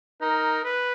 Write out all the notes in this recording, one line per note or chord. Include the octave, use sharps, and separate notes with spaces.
D#4 A#4
B4